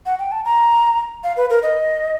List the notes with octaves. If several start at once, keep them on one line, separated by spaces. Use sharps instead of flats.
F#5
G5
A5
A#5
F5
B4
A#4
D#5